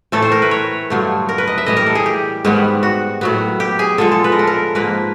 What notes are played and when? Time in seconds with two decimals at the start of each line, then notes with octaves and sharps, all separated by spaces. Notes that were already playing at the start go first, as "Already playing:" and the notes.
0.12 A2 E3 A3 A4
0.22 C5
0.32 A#4
0.42 B4
0.51 C#5
0.90 G2 D3 F#3 A3
1.29 A#4
1.38 B4
1.47 D#5
1.58 E5
1.66 A2 E3 G3 D#5
1.77 A#4
1.86 A4
1.95 G#4
2.06 G4
2.45 G#2 D#3 G3 B3
2.83 F#4
3.21 A2 F#3 B3
3.60 G4
3.79 G#4
3.98 D3 F3 G#3 A4
4.12 A4
4.24 B4
4.32 A#4
4.39 A4
4.47 A#4
4.75 G#2 F3 A#3 B4